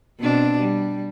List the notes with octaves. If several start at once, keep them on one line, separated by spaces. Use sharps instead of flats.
B2 C4 D4
G3